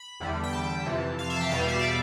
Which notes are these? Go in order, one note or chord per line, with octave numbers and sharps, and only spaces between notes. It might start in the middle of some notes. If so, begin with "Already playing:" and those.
Already playing: B5
E2 D3 G3
G5
A5
F2 C3 E3
F5
E5
A5
G5
E2 B2 G3 F5
E5
D5